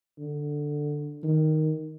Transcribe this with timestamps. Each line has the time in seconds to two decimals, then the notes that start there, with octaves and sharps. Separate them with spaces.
0.18 D3
1.23 D#3